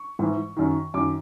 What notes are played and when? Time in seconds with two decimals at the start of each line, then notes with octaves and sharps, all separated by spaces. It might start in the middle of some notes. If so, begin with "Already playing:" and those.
Already playing: C#6
0.19 G#2 E3
0.57 F#2 D#3
0.94 F#2 D#3 D6